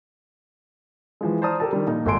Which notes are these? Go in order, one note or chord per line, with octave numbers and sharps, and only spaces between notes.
E3 F3 G#3
C5 D5 A5 A#5 D#6 F6
G4 A4 A#4 A5
D#3 G3
A#2 F3 D#4
G#1 G#2 A4 G#5 C6 D7